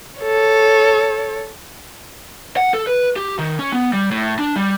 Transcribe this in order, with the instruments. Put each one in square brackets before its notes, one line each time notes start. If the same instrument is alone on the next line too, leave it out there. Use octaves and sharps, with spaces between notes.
[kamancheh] A4 C#5
[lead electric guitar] F#5
A4
B4
G4
D#3
C#4
B3
G3
A2
D4
G3